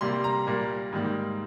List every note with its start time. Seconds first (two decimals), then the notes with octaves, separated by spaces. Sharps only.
0.01 C3 G3 A#3 C6
0.24 A#5
0.47 A#2 G3 A#3
0.93 G#2 D#3 G3 A#3